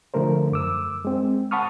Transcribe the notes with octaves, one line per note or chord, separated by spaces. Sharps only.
D3 F3 A3 A#4 C5
F#2 D6 E6
G#3 C4
F#5 A5 B5 C#6 D#6 F6